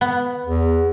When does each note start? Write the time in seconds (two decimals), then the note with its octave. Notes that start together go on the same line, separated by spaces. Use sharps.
0.01 B3
0.46 E2